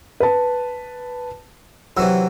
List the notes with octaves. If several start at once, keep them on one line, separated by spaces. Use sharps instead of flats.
B4 A5
C3 E3 F#3 E6